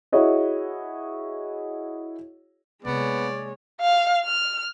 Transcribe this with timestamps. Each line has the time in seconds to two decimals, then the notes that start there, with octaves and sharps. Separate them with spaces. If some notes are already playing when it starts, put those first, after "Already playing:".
0.12 E4 F#4 G#4 C#5 D#5 E5
2.85 C3 G#3 A#3 B3 C#5 D5
3.81 F5
4.24 F6